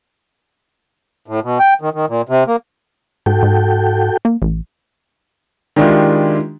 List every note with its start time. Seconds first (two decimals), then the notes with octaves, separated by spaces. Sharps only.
1.28 A2
1.43 B2
1.59 G5
1.81 D#3
1.94 D#3
2.09 A#2
2.29 C3
2.47 A#3
3.26 G#2 F#4 A4 G5
3.43 G#2
4.25 A#3
4.42 A1
5.76 D#3 G#3 D4 E4 F4 G4